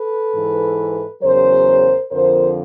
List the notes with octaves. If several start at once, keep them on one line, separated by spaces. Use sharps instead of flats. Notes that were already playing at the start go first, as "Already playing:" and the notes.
Already playing: A4 B4
G#2 E3
E2 C#3 F#3 A#4 C5
F2 D3 F3 A#4 C5